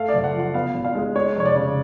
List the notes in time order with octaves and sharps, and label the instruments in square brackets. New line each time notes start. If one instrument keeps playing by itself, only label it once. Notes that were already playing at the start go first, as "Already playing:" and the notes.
Already playing: [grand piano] A3 F5
F#1 D5
F#5
F3
F#5
B3 F5
G#1
F5
G#3
G#3 C#5
F1 C#5
D5
C#3